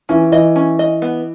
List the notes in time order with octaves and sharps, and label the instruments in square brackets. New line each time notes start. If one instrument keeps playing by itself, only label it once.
[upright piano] E3 [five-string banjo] C#4
[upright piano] E3 [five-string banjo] D#5
[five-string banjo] C#4
D#5
B3